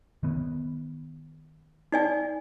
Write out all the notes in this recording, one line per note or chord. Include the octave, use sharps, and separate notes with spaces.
D#3 B3
D#4 D5 G#5